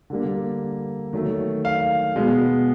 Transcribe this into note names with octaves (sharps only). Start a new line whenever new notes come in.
D3 G3 A#3
D#3 F#3 A3
F5
B2 G#3 B3